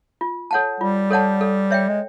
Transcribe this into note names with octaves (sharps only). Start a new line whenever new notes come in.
F4
A4 C#5 F#5 A5
G3 F4
A4 C#5 F#5 A5
A4
C#5 E5 G5
G#3